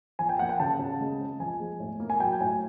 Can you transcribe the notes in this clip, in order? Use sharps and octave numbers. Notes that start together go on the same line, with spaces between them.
F3 G#5
G5
A#3 F#5
G5
C#3 A5
C#3
G#3
C4
F3 G#5
G#3
A2
A#3
G#5
F#3 G5
A2 G#5